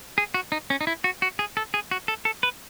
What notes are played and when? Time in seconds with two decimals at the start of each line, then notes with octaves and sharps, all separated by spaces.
0.18 G#4
0.34 F#4
0.52 D#4
0.70 C#4
0.81 D#4
0.87 E4
1.04 F#4
1.22 F#4
1.39 G#4
1.57 A4
1.74 G#4
1.91 F#4
2.08 A4
2.25 A4
2.43 B4